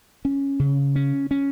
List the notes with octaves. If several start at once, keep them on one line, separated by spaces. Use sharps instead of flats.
C#4
C#3
C#4
C#4